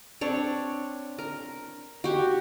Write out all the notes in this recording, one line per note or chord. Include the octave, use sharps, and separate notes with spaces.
C4 D4 C#5
A#4
F#4 G4